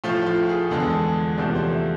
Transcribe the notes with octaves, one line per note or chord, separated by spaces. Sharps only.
A2 F3 A3 F4
F4
G#4
E2 D3 G#3 A4
G#4
A4
E2 C3 F3 A3 D5
C5
E5